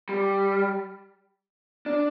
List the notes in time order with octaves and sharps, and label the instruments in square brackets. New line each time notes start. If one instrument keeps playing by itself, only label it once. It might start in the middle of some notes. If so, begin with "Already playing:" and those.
[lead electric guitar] G3
D4